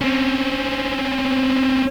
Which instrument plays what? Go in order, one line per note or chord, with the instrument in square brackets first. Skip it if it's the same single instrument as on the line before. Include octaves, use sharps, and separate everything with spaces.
[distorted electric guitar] C4 C#4